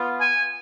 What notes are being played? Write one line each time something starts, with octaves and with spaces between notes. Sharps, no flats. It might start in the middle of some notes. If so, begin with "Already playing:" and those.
Already playing: B3 F4
G#5